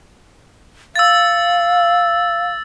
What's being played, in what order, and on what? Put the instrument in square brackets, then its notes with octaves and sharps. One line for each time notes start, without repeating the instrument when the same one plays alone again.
[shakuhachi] F5 [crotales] E6 A6